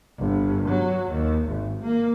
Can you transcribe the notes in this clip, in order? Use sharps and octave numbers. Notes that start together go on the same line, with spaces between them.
G1
F#3
D#2
G#1
A#3